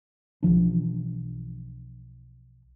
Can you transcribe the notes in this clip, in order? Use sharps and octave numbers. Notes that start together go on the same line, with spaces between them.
B1 E3 F3 D4